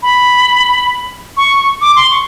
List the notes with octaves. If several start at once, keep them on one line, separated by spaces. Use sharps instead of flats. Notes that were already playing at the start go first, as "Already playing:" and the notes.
B5
C#6
D6
C6
C#6